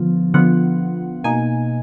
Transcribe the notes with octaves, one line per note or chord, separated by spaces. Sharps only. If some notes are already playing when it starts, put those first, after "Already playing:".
Already playing: D3 F3 B3 F4
D3 F3 B3 F4 F#5
B2 A#3 D#4 G#5